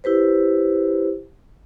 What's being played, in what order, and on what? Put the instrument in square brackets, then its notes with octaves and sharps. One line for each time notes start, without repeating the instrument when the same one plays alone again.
[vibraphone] E4 G4 B4 C5